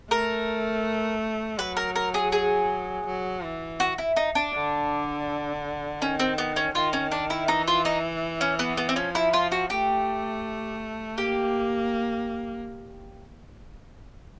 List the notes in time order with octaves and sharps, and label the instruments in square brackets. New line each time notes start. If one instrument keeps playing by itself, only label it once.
[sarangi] A3 [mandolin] A#4
[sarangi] F#3 [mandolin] B4
[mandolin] A#4
A#4
G#4
G#4
[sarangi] F#3
E3
[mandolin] F#4
E4
D#4
D4
[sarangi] D3
[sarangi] D#3 [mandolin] C#4
[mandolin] C4
B3
C#4
[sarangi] D#3 [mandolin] F4
[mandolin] C#4
D4
E4
[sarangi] E3 [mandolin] D#4
[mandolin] F4
D#4
C#4
B3
B3
C4
[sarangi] F3 [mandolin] C#4
[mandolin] E4
F4
F#4
[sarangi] A3 [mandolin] G4
[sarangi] A#3 [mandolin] G4